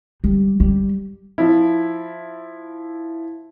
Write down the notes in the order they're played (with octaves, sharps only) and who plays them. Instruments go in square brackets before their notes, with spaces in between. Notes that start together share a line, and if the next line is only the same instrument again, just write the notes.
[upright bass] G3
G3
[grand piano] F3 E4